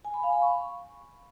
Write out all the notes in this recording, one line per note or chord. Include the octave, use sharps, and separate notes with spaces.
G#5
B5
F5
B5
C#6